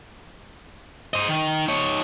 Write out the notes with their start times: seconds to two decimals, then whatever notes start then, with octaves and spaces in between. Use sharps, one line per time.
1.14 C5 D#5
1.28 D#3
1.68 D#4 C#5